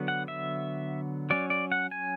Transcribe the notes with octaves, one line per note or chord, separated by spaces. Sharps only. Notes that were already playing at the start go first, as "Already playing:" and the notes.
Already playing: D3 F#3 B3
F#5
E5
F#3 C#4 D5
D5
F#5
G#5